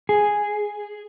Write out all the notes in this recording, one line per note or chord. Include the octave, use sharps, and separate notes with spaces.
G#4